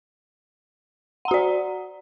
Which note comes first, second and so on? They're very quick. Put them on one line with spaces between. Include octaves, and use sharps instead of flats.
F#5 A#5 F#4 D5